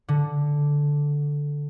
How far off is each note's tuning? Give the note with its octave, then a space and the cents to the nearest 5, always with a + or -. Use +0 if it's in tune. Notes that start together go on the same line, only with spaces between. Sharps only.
D3 -5